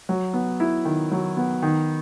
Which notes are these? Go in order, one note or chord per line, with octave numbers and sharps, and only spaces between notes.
F#3
B3
E4
D#3
F#3
B3
D#3